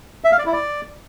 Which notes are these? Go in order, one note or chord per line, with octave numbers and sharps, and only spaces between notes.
E5
F5
D5
E4
D5